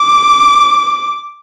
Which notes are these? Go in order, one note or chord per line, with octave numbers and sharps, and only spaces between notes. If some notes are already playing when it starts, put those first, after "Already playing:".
Already playing: D6